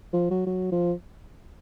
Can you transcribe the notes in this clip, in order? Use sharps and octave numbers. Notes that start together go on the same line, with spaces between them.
F3
F#3
F#3
F3